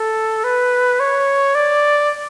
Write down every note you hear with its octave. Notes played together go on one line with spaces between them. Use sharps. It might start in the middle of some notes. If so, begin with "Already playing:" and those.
Already playing: A4
B4
C#5
D5